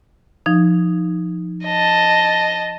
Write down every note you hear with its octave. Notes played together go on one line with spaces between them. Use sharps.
F3 D#4
D#5 A5